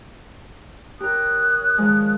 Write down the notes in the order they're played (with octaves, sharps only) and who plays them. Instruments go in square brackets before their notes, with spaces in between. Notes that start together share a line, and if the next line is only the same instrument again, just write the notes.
[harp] G4 A#4 [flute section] C#5 D#6 F#6
[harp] D#3 F3 G#3